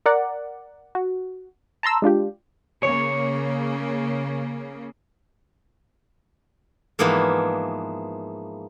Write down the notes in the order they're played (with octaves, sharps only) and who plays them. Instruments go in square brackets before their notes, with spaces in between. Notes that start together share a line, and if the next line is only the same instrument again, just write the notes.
[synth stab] A#4 D5 F#5
F#4
A5 A#5 C6 E6
G#3 D4 F4 G4
[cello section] C#3 A#3 [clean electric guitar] C#5
[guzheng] G#2 E3 F3 A#3 B3 G#4